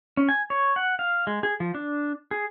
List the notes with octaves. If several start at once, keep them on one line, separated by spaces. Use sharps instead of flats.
C#4
G#5
C#5
F#5
F5
G#3
G#4
F3
D4
G#4